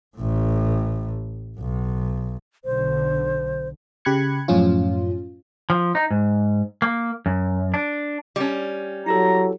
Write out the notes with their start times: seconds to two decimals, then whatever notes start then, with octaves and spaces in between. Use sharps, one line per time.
0.17 A1 A2
1.59 B1
2.65 B1 D3 C5
4.05 C#3 G4 B5 F#6 G#6 C#7
4.48 F#2 A2 F3 C#4 F4
5.70 F3
5.95 D#4
6.11 G#2
6.82 A#3
7.26 F#2
7.74 D4
8.36 G3 C#4
9.06 F#3 E4 G4 A4 A#5